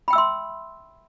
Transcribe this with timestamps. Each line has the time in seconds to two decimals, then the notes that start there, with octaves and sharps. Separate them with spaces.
0.08 B5
0.10 G5
0.13 E6
0.15 E5
0.18 C6